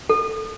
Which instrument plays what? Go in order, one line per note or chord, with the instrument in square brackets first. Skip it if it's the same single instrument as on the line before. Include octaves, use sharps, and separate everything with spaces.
[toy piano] A4